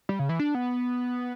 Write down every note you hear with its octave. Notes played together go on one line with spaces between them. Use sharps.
G3
C#3
E3
D4
B3